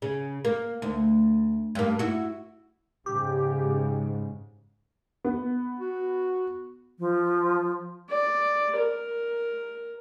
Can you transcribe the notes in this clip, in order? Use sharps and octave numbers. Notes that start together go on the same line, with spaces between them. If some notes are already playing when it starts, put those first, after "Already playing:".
C#3
A#3
D2
G2 A#3
E4 F#4
G#2 C#3 G4
B3
F#4
F3
D5
A#4